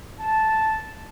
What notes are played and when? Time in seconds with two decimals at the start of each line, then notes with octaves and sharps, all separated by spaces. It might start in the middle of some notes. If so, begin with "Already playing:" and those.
0.20 A5